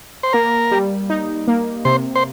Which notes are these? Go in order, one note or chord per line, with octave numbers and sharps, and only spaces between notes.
C5
A#3 A#4
G3
D#4
A#3
C3 C5
C5